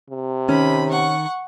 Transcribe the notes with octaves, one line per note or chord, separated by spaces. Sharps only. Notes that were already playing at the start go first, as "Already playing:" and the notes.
C3
D#3 C#4 B5
F#5 C#6